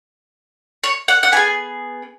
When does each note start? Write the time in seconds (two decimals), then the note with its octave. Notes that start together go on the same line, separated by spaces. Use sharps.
0.84 C#5
1.08 F#5
1.23 F#5
1.32 B3 F4 G#5
1.37 G#4